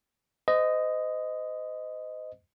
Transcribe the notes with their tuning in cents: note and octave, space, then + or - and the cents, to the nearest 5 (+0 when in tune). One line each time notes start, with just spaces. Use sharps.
C5 -40 D#5 +0